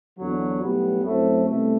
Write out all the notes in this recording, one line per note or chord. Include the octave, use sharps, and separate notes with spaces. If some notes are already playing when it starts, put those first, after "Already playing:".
E2 D3 F#3
B1 A2 G3 B3
F#2 F#3 A3 C4 E4
C2 B2 A3